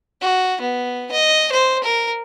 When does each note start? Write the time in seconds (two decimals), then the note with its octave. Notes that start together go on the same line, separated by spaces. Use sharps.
0.21 F#4
0.61 B3
1.11 D#5
1.52 C5
1.84 A#4